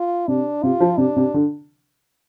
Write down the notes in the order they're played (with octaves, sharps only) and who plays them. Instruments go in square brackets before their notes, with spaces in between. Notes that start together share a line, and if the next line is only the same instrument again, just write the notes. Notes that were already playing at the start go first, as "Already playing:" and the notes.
Already playing: [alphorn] F4
[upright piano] C3 [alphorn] D4
[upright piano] C3 [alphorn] F4
[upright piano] F3
[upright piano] C3 [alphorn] D4
[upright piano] C3
D3